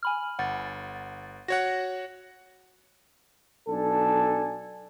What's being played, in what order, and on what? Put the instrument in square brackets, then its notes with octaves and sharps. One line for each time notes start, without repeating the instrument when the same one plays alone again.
[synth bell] G#5 B5 F6
[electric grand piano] G1 [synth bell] F#5 A6
[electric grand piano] F#4 C#5 F#5 [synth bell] A#6
[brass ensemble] B1 D4 A4 G#5 A5